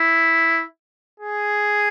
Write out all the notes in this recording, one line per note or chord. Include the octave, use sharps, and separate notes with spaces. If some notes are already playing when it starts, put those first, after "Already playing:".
Already playing: E4
G#4